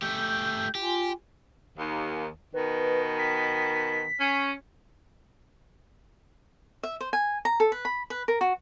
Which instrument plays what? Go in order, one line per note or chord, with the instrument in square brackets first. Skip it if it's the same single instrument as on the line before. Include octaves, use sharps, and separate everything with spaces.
[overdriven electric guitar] A3 G4 [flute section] G6
[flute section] F4 G#5 [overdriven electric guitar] G4
[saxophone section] D#2
[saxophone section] B2 D#3 [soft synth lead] B4
[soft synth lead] B6
[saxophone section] C#4
[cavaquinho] E5
C5
G#5
A#5
A4
B4
B5
B4
A#4
F#4